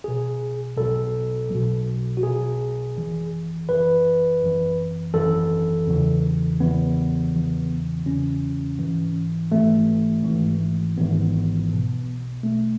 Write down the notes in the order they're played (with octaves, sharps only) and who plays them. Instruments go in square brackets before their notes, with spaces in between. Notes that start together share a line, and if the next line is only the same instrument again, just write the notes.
[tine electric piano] B1 B2 G#4
B1 B2 A4
B1 B2
F#4
B1 B2 G#4
G#1 F#2 E3
G#1 F#2 E3 B4
G#1 F#2 E3
G#1 F#2 E3 A4
E2 C#3 E3
E2 C#3 E3 B3
E2 C#3 E3
E2 C#3 E3 C#4
G#1 G#2 E3
G#1 G#2 E3 A3
G#1 G#2 E3
G#1 G#2 E3 B3
B1 B2
B1 B2 A3